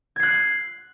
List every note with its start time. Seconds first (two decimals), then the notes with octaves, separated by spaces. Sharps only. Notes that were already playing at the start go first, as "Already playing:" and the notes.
0.16 G#6
0.20 C7
0.23 F#6